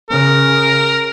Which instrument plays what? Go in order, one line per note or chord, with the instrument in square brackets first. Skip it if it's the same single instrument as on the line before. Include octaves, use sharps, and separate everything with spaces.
[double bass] C#3 [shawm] A#4